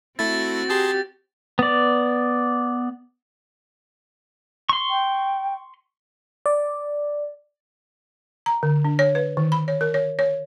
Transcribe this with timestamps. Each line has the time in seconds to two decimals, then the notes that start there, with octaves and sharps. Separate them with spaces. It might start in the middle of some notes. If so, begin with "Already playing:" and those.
0.19 A3 C4 E4 F#4 A6
0.70 G4 G#4 A5 C6
1.59 B3 D5
4.69 C6 C#6
4.89 G5
6.46 D5
8.46 A#5
8.63 D3
8.85 D4
8.99 C#5
9.15 B4
9.37 D#3
9.52 B5
9.68 C#5
9.81 A#4
9.94 C#5
10.19 C#5